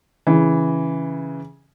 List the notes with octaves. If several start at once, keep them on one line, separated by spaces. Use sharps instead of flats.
C#3 E3